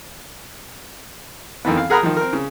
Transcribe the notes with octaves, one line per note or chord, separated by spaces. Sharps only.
F2 D#3 E3 B3
F5
G#4 A#4 F#5 A#5 B5 D#6
D#3 F3
C4 A#4
C#3